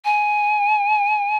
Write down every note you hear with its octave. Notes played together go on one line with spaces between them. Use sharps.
G#5